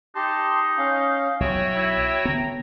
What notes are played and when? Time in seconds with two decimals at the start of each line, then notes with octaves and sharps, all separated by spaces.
0.15 D#4 G4 A5 C6
0.78 C#4 F5
1.40 B1 F#4 C#5 E5 G5
1.75 E4
2.25 D3 B3 A#5